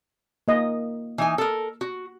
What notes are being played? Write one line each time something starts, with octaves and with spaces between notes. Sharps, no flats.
A#3 D#5
E3 D#4 G#5
A4 A#4
F#4